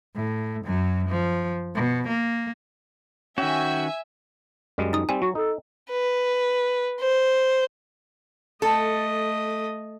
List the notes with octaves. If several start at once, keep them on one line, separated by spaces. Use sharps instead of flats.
A2
F#2 F#3
F3
B2
A#3
D#3 C#4 F#4 E5 G5 G#5
F#2 G3 G#3
D#4 D#6
G3 C4 G#5
F#3 F#4
D#4 A4
B4
C5
A3 A4 D#5